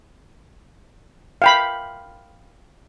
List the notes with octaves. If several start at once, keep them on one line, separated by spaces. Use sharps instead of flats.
F5 G5 B5